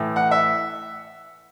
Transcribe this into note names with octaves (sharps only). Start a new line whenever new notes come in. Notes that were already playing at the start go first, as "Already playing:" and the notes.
Already playing: A2 E3
F#5
E5